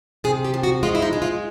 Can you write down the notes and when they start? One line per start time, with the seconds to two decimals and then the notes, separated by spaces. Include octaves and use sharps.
0.24 C3 G#4
0.44 G4
0.54 F3
0.63 F#4
0.83 G#3 F4
0.95 E4
1.02 D#4
1.13 G#3
1.22 F4